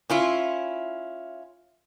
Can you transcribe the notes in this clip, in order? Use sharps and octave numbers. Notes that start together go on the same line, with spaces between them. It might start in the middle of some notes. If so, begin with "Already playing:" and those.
C#4 E4 F4